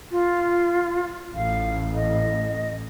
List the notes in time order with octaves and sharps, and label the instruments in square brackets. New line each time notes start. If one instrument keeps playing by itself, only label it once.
[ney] F4
[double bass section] A1 [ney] F5
[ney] D#5